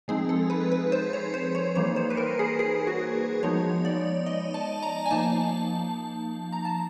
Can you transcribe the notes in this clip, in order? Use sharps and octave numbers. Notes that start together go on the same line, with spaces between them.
F3 G#3 C4 D#4 G#4
A4
B4
B4
C5
C#5
C5
C#5
E3 G3 A#3 D#4 C#5
C5
B4
A#4
G#4
G#4
F#4
F3 G#3 B3 D#4 C#5
D5
D#5
A5
A#5
G#5
F3 A#3 D#4 A5
A#5
A5